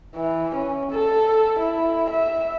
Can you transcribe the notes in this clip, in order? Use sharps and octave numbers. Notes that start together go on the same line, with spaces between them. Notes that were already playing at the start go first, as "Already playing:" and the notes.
E3
C#4
A4
E4
E5